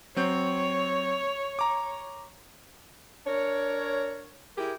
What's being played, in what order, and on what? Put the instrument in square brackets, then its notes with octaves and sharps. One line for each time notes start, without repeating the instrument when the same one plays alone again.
[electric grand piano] F#3 C4 G6 [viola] C#5
[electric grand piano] A#5 D6
[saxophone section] D4 A#4 C#5
E4 G4 G#4 A#4